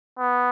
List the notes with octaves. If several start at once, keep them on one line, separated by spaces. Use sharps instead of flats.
B3